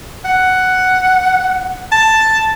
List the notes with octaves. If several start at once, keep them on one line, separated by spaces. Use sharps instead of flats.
F#5
A5